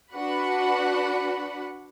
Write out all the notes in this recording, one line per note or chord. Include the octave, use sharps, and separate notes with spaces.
D4 F#4 B4 F#5 B5